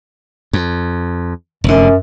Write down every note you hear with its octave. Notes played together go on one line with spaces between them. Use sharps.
F2
F1 F#2 D3